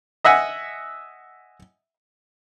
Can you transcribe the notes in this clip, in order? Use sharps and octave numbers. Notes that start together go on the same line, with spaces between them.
D#5 E5 F#5 G#5